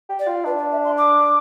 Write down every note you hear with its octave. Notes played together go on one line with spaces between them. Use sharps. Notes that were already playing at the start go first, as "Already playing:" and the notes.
G4
D5
F4
D4 B4
D5
E5
C6
D6